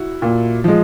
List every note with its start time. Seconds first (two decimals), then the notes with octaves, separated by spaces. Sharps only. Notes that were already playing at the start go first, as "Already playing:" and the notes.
Already playing: E4 F#4
0.22 A#2
0.64 F3 G#3